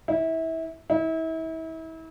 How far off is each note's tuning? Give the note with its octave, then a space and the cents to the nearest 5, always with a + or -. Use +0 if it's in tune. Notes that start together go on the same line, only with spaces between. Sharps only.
E4 -25
E4 -35